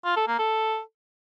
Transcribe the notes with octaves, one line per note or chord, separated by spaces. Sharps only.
F4
A4
A#3
A4